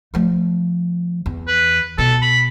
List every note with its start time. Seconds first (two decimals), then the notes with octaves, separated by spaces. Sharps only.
0.14 F3 A3
1.26 E2
1.48 B4
1.98 B2 A4
2.22 B5